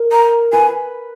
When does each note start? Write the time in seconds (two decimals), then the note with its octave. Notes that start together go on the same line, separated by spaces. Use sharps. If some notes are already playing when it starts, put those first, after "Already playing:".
Already playing: A#4
0.12 A#5
0.52 B4 G#5